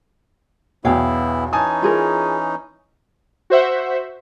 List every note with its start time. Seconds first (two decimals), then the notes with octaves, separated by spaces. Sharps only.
0.84 B1 E2 B3 E4 C#5 F5 G5
1.53 E3 C#4 D#4 G#5 A5 D#6
1.82 F4 G#4 A#4
3.50 F#4 C5 E5 F#5